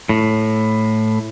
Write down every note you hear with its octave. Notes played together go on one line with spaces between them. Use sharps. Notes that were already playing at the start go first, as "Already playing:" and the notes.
A2